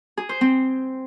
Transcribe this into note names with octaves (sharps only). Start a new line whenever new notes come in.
G#4
C5
C4